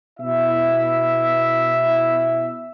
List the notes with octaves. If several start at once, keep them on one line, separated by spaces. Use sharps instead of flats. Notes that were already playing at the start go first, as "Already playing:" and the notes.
B2 E4 E5